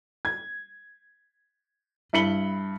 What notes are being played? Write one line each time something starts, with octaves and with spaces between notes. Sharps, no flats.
G#6
G2 E4 B5 C#7 F#7 G7